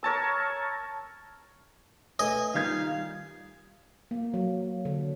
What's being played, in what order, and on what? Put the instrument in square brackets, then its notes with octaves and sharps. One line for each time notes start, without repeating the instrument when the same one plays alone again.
[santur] A#4 C#5 A5 E6
[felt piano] A3 B4 [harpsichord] D#5 [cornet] G#5
[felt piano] D#3 G#6 [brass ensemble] G3 A#3 F4 [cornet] F5
[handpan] A#3
F#3
D3